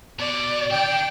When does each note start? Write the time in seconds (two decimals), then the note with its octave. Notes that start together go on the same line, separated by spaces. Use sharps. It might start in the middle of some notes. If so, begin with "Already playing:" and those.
0.19 B2 D5
0.71 D4 A4 G5